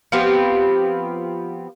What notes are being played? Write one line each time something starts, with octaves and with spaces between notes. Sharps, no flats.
F3 B3 C4 G4